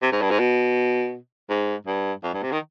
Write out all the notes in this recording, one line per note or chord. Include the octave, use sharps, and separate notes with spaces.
C3
G#2
G2
G#2
B2
G#2
G2
F2
G2
C3
D#3